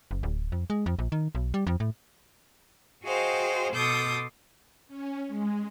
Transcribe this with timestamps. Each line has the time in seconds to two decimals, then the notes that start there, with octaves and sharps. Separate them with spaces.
0.11 F#1
0.23 D1
0.52 F2
0.70 G#3
0.86 F2
0.99 A#1
1.12 D#3
1.35 B1
1.54 G3
1.67 F2
1.80 A2
3.04 F#4 G#4 C5 D#5 F5 G5
3.73 B2 A4 C6 D6 D#6 G6
4.88 C#4
5.28 G#3